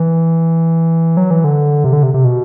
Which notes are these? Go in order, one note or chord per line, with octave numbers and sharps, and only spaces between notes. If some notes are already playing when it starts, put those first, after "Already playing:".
Already playing: E3
F#3
E3
D3
C3
D3
C3
C3
B2